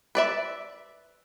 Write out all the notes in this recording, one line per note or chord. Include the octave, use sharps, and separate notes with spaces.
B4 D5 E5